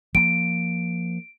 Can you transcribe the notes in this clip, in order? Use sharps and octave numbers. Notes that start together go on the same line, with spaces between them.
F3 A#3 D7